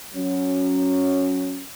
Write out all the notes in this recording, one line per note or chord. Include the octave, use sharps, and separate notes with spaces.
F#3 C#4